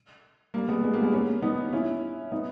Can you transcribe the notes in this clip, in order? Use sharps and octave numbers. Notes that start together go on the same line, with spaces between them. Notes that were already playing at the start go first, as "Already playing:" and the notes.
G3 A#3
G#3 B3
G#3 B3
G3 A#3
G#3 B3
A#3 C#4
B3 D#4
C#4 E4
B3 D#4